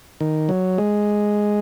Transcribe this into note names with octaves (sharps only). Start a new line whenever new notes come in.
D#3
F#3
G#3